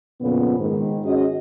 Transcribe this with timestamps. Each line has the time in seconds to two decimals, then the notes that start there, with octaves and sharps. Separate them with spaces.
0.21 F2 A#2 C#3 B3
0.59 G#2 D#3
1.04 C#4 F#4 G#4 D#5